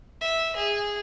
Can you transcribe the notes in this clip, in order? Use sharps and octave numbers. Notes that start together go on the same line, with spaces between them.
E5
G#4